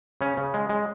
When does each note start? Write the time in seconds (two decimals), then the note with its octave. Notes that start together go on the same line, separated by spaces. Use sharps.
0.21 C#3 C#4
0.37 C#3
0.54 G#3
0.69 G#3